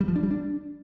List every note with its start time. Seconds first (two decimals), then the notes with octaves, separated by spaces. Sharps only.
0.01 G3
0.08 F3
0.16 D4
0.23 G3
0.31 D4